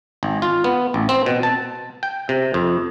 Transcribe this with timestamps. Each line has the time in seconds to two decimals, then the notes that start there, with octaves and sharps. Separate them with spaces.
0.23 G#1
0.42 F4
0.64 B3
0.94 A1
1.09 C4
1.26 B2
1.43 A5
2.03 G5
2.29 C3
2.54 F2